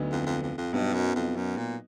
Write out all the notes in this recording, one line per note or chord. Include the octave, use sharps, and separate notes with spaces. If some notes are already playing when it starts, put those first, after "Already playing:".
Already playing: D2 D3 F#3 B3 D#4
F2
F2
F2
F2
G2 B2 F#3 B3 D#4
F#2
F2
F#2
A#2